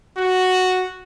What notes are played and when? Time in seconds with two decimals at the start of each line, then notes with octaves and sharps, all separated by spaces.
0.17 F#4